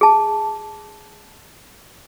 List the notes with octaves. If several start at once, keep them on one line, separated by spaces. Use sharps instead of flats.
G#4 A5